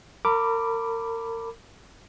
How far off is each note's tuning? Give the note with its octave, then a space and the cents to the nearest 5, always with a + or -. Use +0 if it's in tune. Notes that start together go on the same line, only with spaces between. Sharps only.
A#4 -35 B5 +0 D6 +0